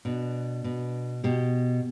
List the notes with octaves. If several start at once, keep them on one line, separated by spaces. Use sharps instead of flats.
B2 D4
B2
B2 G4